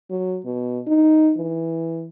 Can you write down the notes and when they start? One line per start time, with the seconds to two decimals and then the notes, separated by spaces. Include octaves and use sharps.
0.10 F#3
0.45 B2
0.87 D#4
1.37 E3